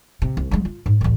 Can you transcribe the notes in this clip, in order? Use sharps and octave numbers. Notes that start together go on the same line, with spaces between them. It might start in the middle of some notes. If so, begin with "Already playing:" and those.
C3
C2
F#3 G#3
F4
G#2
A1 D2